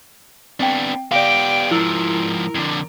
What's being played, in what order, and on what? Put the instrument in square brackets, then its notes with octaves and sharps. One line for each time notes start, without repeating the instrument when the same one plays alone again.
[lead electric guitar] B3 D4 [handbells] C4 G5
[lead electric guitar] B3 G4 [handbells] D5 F5 [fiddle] G5 D6
[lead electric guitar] G#2 F3 [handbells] E4 E6 [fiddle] A#4
[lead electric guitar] F2 D3